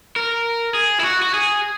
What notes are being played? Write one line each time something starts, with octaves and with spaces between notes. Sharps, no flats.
A#4
G#4
E4
F#4
F#4
G#4